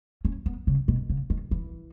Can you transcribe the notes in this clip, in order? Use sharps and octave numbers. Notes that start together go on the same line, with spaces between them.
C#4
B3
C#3
B2
C#3
D#3
E3